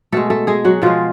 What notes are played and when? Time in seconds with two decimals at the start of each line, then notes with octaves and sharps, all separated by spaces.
0.12 B2 G#3 A3 A4
0.30 A3 A4
0.47 G#3 G#4
0.65 F#3 F#4
0.82 B2 F3 G#3 F4